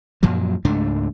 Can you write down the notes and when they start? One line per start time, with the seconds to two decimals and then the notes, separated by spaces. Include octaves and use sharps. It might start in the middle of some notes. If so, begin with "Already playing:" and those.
0.23 F#2 A#2 F3 F#3
0.65 C#2 G#2 A3 D4